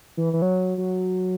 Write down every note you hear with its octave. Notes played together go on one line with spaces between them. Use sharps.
E3
E3
F#3
F#3